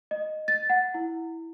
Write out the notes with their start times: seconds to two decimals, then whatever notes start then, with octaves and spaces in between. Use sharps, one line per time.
0.11 D#5
0.48 A6
0.70 F#5
0.94 E4